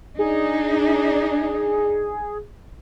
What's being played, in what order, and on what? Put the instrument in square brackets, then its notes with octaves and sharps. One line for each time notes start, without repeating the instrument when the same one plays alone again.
[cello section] D4 D#4 [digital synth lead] G#4